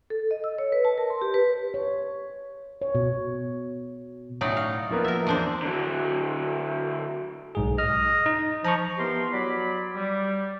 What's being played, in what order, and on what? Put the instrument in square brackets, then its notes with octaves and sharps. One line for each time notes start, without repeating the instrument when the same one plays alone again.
[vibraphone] A4
D#5
E6
C#5
B4
A5
A#4
C6
G4
B4
[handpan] C#5
C#5
B2
[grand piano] A2 C#4 [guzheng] F#3 D#4 D5
[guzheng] F5
[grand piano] F3 A#3 B3
[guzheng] A#4 E5
E2 D4 C5
[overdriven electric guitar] D3 F#3
[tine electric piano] B1 G#2 G#4
[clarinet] D#5 [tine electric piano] F6
[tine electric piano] D#4
[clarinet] F3 [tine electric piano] A#5 C#6
[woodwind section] E3 B3 G4 A#4 C6
F#3 D5 B5
G3